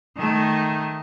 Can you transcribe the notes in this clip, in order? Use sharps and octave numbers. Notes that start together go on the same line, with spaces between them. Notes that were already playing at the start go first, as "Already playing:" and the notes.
D#3 A3